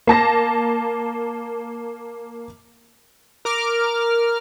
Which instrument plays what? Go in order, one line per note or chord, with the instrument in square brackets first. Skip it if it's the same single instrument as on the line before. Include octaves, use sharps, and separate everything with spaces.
[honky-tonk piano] A#3 A5 A#6
[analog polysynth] A#4 D6 F6